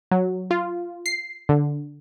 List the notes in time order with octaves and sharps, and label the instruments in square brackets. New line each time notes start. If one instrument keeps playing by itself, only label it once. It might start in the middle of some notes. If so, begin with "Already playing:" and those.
[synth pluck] F#3
F4
C7
D3